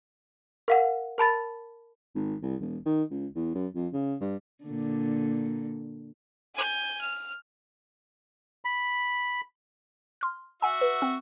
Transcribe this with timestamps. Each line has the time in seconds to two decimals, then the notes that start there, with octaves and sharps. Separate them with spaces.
0.68 A#4 F5 F#5
1.18 A#4 A5 B5 A6
2.15 G#1
2.42 C2
2.61 E1
2.86 D#3
3.10 C#2
3.35 E2
3.54 F#2
3.75 F2
3.93 C#3
4.20 G2
4.64 A#2 D3
6.54 G#5 G6
7.01 F6
8.65 B5
10.21 C6 F6
10.62 F#4 E5 F#5 G#5
10.81 B4
11.02 C4